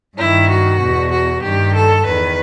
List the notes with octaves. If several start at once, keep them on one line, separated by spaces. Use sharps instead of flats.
G2 E4
D#3
F#4
E2 B2
F#4
G2 D#3 G4
A4
E2 D#3 B4